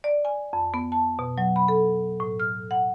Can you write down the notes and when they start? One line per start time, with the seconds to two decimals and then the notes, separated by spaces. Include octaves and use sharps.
0.04 D5
0.25 G#5
0.53 F2
0.74 B3
0.92 A5
1.19 B2
1.38 F#3
1.56 B5
1.68 A4
2.20 A2
2.40 F6
2.71 F#5